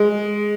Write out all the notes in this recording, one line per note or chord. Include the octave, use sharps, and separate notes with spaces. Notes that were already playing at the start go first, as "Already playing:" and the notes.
Already playing: G#3